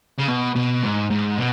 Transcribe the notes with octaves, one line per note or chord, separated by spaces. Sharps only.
C#3
B2
B2
G#2
G#2
B2